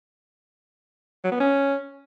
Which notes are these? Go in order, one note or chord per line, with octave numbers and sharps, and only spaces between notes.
F#3
B3
C#4